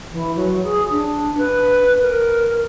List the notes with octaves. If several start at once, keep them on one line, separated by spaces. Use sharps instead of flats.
E3
F#3
G#4
D4
B4
A#4